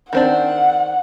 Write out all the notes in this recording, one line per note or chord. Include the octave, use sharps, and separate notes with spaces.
D#3 C4 D4 F#5